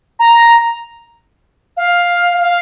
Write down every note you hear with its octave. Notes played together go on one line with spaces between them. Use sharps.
A#5
F5
F5